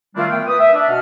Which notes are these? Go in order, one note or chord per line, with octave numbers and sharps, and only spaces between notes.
D#3 G3 A3 C4 D4 F4
A3 B3 G5
B4 D#6
E5
D4
B2 D#5 F#5 F6